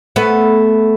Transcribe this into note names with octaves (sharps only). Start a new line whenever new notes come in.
A3 B3